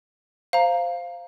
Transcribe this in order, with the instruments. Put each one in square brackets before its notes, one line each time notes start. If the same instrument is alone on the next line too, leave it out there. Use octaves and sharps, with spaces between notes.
[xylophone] C5 F5 A#5